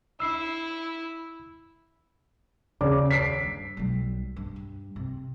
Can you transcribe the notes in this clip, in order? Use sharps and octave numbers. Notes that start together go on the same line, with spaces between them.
E4 E6 C7
D#2 C#3 D5 D6
B6 C7 D7
G2
B1 G3
G2
C3